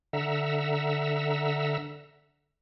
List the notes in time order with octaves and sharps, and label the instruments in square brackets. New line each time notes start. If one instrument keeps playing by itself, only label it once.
[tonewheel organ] D3 E5 F#5 A#5 E6